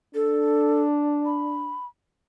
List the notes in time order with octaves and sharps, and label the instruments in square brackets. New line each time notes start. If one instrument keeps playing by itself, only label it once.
[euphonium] D4 [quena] A4
[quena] B5